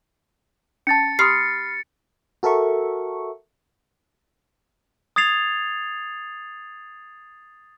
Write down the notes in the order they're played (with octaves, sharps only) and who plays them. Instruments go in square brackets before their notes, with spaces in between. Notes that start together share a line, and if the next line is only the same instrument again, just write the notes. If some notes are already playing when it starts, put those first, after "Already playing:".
[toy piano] C#4 A5 [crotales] A6 C#7
[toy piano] G4 C6 D#6 [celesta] B5 F6 C7
[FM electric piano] F#4 A4 A#4 E5 C#6
[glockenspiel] D#6 G#6 A6 C7 F7